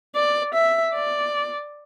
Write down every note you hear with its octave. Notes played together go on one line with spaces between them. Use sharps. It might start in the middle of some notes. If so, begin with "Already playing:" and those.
D5
E5
D5